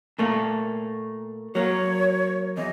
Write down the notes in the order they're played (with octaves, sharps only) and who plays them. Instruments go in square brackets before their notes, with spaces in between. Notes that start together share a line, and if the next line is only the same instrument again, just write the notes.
[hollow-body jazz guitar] A#2 A3 A#3
[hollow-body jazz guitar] F#3 A#3 [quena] C#5
[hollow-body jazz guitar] E2 [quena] D#5